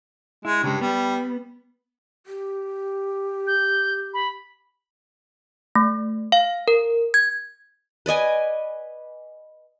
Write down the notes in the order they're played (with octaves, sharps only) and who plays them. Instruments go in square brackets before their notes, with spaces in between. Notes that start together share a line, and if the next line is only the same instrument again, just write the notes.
[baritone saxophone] G#3 [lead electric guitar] E4
[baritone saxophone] G2 [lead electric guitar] C#3 G#3
[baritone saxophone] G3 [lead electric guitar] B3
[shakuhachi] G4
[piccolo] G6
B5
[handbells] A3
F5
A#4
G#6
[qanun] B4 D5 D#5 G#5